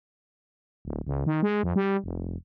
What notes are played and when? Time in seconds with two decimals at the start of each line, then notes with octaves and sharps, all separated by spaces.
0.85 D1
1.07 C#2
1.26 D#3
1.43 G#3
1.63 F2
1.76 G3
2.04 F1